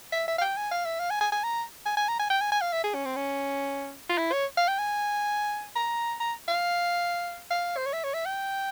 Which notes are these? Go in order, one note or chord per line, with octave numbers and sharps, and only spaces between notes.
E5
E5
F5
G5
G#5
F5
E5
F5
G#5
G#5
G#5
A#5
G#5
G#5
A#5
G#5
G5
G#5
G#5
F5
E5
G#4
C#4
C4
C#4
F4
E4
C#5
F5
G5
G#5
A#5
A#5
F5
F5
C5
C#5
E5
C#5
E5
G5